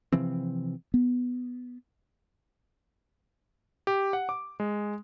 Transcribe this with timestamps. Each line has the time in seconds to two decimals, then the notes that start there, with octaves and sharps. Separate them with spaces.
0.12 C3 E3 F3 C4
0.94 B3
3.87 G4
4.13 F#5
4.29 D6
4.60 G#3